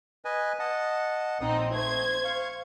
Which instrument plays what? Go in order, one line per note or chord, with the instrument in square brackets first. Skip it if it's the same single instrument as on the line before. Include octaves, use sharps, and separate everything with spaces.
[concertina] B4 D#5 G#5
D#5 F#5 A5
[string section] A#1 C4 D#4 [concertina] D#6
[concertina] A3 [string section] C5 G#6
[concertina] F5 C#6